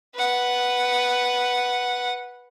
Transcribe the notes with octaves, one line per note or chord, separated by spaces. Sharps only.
B4 F#5